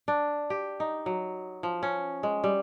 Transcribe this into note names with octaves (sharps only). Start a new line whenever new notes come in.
D4
G4
D#4
F#3
F3
C#4
G#3
G3